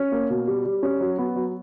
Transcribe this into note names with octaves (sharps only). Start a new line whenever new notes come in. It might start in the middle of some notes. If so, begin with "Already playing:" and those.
Already playing: C#4
A#3
B2
G3
G3
C#4
F#3
B3
F#3